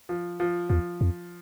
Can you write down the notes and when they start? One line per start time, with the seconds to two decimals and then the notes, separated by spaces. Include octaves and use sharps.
0.09 F3
0.40 F3
0.69 E2 F3
1.01 F2